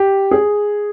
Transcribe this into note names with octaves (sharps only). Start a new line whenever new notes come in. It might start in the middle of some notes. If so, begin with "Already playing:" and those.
Already playing: G4
G#4